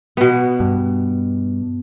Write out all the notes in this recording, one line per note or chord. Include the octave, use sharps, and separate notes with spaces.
B2 B3
G2